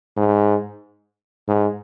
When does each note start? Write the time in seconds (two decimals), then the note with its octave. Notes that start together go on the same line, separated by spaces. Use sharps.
0.17 G#2
1.48 G#2